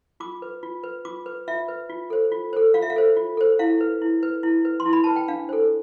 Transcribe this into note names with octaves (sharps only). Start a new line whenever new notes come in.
F4 D6
B4
F4
B4
F4 D6
B4
F4 E5
B4
F4
A4 C5
F4
A4 C5
F4 F5
E5
F5
A4 C5
F4
A4 C5
E4 F5
B4
E4
B4
E4
B4
C6
E4
B5
B4 A5
G5
D4 F5
A4 C5